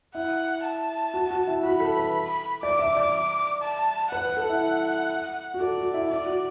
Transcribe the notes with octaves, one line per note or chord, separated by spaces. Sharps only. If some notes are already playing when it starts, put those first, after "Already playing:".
E4 F#5
A5
F#4
F#4
E4
F#4 B5
A4
B4
D5 D6
E5
D5
A5
B4 F#5
B4
A4
E4
F#4
A4 D5
F#4
E4
E4 D5
F#4